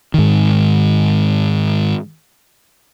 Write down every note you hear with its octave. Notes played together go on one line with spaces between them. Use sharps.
G#2 D#3